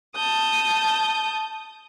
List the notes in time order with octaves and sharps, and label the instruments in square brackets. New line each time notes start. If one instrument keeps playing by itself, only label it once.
[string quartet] A5 D#6 G6